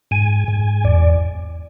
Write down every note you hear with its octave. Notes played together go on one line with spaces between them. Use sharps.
G#2 G#5
G#2
E2 D5